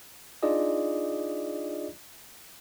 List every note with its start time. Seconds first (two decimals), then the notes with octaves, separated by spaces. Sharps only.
0.43 D4 D#4 F4 G#4 D5 D#5